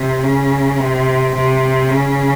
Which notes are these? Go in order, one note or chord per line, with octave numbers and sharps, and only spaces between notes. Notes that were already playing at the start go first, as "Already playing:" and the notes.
Already playing: C3
C#3
C3
C3
C#3